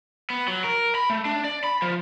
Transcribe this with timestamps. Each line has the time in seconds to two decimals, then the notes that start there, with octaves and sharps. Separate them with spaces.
0.30 B3
0.48 F#3
0.64 A#4
0.95 B5
1.10 A3
1.25 D4
1.44 D5
1.64 B5
1.82 F3